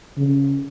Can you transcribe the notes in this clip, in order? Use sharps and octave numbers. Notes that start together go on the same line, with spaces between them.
C#3